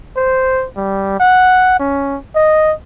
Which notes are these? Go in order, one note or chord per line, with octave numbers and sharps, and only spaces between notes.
C5
G3
F#5
C#4
D#5